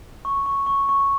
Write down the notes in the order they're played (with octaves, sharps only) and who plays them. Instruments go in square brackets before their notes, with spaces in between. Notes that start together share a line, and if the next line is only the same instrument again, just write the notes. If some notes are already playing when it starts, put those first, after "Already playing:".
[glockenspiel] C#6
C#6
C#6
C#6